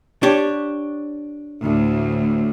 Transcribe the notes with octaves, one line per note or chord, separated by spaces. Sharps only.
D4 G4 C#5
D2 A2